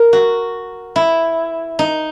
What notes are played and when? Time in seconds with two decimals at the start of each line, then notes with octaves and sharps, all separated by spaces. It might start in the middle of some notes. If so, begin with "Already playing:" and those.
Already playing: A#4
0.13 F#4
0.96 E4
1.79 D#4